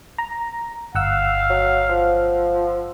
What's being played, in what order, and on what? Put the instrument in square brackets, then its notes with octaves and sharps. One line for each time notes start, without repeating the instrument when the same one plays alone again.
[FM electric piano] A#5
[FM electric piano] G1 F#5 E6 [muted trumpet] F5
[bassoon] F#3
F3